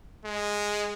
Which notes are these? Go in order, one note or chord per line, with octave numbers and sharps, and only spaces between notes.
G#3